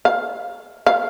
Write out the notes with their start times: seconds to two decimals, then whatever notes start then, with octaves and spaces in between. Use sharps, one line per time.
0.05 F5
0.87 F5